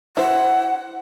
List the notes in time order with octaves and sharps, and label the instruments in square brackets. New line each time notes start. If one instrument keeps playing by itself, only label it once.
[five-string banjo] E4 C5 [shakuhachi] F#5